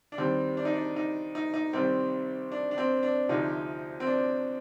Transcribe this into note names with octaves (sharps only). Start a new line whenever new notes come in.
D4
D#2 D#3 G3 C4
D4
D#4
D4
D#4
D#4
D#4
C2 C3 D#3 G3 C4
D4
D4
C4
D4
D2 C3 F3 D#4
C4
D4